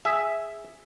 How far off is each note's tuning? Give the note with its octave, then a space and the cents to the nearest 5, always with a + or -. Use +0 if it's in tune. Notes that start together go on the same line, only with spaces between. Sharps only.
G#4 +0 E5 +0